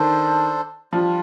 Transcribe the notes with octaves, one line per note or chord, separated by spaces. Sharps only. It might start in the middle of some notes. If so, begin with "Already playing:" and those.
Already playing: D#3 D4 A4 C5
F3 G3 D4 F4